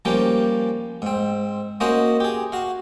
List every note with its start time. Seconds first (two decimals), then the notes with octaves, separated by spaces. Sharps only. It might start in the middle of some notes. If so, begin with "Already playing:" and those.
0.05 F3 G3 A#3 C#4 G4
1.02 G#2 C4
1.80 A#3 C#4 F#4 C5 D#5
2.20 G4 G#4
2.52 F#4 F5